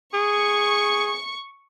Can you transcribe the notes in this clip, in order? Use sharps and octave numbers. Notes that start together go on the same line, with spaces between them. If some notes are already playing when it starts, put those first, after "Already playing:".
G#4 C#6